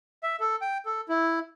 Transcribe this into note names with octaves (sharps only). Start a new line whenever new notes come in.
E5
A4
G5
A4
E4